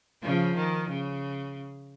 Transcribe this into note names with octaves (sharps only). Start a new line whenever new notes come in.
C#3 F3
D#3
C#3